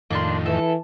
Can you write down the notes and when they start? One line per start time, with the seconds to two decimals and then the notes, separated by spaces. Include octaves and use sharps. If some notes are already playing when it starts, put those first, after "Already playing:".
0.11 F2 A2 D#3 A#3 D4 C6
0.46 E3 A4